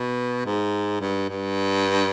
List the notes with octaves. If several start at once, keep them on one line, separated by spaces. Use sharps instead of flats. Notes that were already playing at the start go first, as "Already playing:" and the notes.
Already playing: B2
G#2
G2
G2